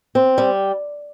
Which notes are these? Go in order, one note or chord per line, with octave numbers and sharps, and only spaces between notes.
C4
G3